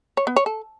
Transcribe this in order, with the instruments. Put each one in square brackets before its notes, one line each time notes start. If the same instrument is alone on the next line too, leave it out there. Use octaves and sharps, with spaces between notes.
[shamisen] C#5
B3
C#5
A4